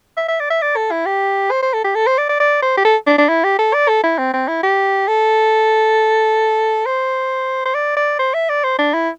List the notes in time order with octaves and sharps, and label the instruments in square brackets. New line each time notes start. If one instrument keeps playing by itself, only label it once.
[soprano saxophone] E5
E5
D5
E5
D5
A4
E4
G4
C5
C5
A4
G4
A4
C5
D5
D5
D5
C5
G4
A4
D4
D4
E4
G4
A4
D5
A4
E4
C4
C4
E4
G4
A4
C5
C5
D5
D5
C5
E5
D5
C5
D4
E4